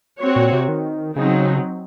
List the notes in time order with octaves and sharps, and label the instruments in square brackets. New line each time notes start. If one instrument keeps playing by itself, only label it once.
[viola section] C4 F#4 C#5
[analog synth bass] A#2
C3
D#3
[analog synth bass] C#3 [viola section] F#3 C4 D#4